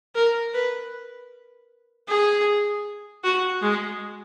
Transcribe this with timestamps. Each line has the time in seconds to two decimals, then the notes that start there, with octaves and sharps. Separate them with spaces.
0.15 A#4
0.54 B4
2.08 G#4
3.24 F#4
3.62 G#3